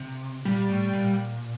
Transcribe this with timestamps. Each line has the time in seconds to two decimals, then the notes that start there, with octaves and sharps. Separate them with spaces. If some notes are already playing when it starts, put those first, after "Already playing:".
Already playing: C3
0.45 A#2 G3
0.70 A2
0.93 A#2